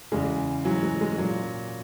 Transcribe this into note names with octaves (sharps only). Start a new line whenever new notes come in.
E2 C#3 E3 G#3
G#2 E3 F#3
G#3
G#3
A#2 F#3